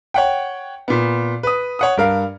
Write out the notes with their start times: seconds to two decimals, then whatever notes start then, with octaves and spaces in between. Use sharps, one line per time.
0.14 C#5 F#5 G5
0.88 A#2 B3
1.43 B4 D#6
1.79 C#5 F#5 D#6
1.97 G2 A#4 F5